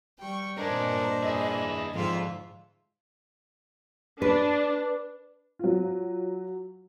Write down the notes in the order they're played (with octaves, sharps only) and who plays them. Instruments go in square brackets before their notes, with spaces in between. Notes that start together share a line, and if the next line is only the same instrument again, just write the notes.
[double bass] G3 [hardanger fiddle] G5 C#6
[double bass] G2 A#2 [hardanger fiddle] D4 C5 [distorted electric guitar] A#4 G#5 [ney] D#5
[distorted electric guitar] E4 G#4
[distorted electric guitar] F2 [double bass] G#2 D3 [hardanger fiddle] F4 E5
[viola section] D4 [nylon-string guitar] B4
[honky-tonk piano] F#3 F4